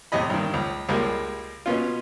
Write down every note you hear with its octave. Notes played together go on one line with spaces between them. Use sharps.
E2 A2 C3 D#5 B5
G2 D#3
C#2
C#2 G3 G#3 A#3
B2 B3 C#4 F4